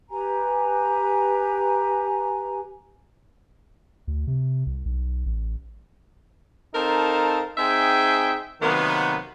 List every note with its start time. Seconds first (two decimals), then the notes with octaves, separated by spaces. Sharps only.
0.10 G4 B4 G#5 A#5
4.07 D2
4.27 C3
4.66 C2
4.85 B1
5.26 A1
6.75 C4 D#4 A4 A#4 F5 A5
7.58 C4 D#4 G#4 E5 G5 G#5
8.62 C3 D#3 F#3 A#3 B3